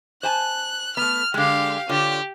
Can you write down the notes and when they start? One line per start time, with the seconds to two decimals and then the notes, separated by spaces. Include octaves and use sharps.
0.23 C5 G#5 A5 F#6
0.97 A3 B3 F6
1.34 D3 G#3 G4 F5
1.89 D3 F4 G4 C#5